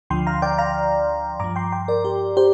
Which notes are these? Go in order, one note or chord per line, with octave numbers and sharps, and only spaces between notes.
D2 D3 F3 G5 C6
F5 A#5
D5 G5
F5 A#5
G2 F3 A#5 D6
G5 C6
G5 C6
A#4 D5
G4
G4 C5